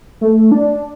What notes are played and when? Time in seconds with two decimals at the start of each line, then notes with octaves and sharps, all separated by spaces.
0.21 A3
0.51 D4